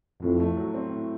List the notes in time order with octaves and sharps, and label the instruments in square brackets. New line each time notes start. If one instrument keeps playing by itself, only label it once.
[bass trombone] F2 [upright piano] A2
[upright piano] A3
F#3
C4
A2